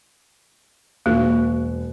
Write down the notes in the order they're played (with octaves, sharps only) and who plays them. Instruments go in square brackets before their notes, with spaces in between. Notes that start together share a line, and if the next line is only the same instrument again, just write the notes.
[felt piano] E1 F#4 [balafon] A#3